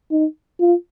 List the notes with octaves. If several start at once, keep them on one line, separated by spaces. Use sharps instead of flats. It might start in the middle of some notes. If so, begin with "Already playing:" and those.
D#4
F4